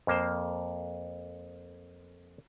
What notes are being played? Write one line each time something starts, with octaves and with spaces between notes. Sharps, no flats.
F2 A#3 C5